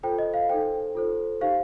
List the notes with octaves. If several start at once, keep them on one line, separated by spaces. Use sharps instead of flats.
F4 A4 C5 G5
D#5
F5
D#4 A4 C5 G5
F4 A4 C5
D#4 G4 C5 F5